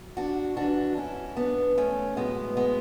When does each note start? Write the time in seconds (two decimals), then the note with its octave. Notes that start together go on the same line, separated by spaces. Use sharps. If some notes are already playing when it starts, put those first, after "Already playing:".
Already playing: F#3
0.17 D4 F#4
0.57 G#2 E3 D4 F#4
0.97 C#4 E4
1.36 B3 D4
1.78 A3 C#4
2.17 A2 F#3 G#3 B3
2.57 G#3 B3